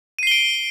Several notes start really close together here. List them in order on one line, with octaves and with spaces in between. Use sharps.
D#7 C7 G7 D7